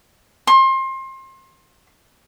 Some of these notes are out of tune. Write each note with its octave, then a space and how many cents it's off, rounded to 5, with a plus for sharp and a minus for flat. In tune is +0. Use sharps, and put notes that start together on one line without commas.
C6 +30